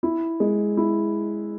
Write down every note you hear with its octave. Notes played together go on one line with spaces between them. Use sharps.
E4
G#3
E4